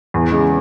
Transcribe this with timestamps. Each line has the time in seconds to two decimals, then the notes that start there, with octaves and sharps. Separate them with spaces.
0.14 E2
0.32 C#3 G#3